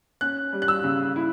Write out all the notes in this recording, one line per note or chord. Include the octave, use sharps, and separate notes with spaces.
C#4 F#6
G3
F#6
E6
C#3
E4